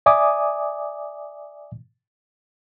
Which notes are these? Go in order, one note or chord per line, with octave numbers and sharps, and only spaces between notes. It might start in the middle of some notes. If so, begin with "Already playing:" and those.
D5 E5 G#5 D6 D#6